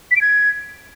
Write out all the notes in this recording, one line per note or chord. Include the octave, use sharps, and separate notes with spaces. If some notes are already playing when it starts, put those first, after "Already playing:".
B6
D7
G#6